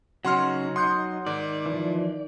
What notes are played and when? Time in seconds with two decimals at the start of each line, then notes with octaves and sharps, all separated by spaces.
0.25 C#3 F#3 C#4 D#4 F#5 C6 F6
0.76 F#5 C6 D#6 F#6 G6 C#7
1.26 G#2 D#3 D5
1.66 E3 F3